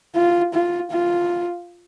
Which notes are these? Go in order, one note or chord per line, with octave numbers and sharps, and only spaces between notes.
F4
F4
F4